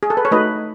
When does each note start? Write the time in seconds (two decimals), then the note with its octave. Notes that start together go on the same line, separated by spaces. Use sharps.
0.03 G#4
0.10 A4
0.17 B4
0.25 C#5
0.31 A3 D#4 F#4 B4 D#5